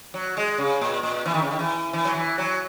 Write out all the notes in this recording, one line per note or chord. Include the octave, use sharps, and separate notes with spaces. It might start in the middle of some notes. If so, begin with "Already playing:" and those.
F#3
G#3
C#3
A#2
A#2
E3
D#3
C#3
D#3
E3
E3
F#3
E3
F#3